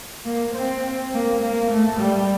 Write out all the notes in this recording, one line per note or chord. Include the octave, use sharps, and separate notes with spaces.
A#3
C4
A#3
A#3
A3
G3